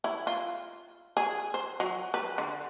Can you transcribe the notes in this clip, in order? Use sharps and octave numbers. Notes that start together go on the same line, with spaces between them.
E4
F4
G#4
C5
F#3
B4
D3